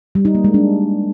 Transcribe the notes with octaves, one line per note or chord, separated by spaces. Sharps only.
G3
D#4
A#3
G#3
D4